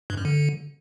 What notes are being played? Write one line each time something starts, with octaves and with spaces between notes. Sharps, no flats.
G2
F#2
D3